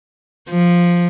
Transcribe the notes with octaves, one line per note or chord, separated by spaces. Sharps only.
F3